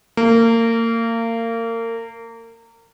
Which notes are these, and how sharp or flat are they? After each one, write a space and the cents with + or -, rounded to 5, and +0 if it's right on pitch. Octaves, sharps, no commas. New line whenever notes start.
A#3 -30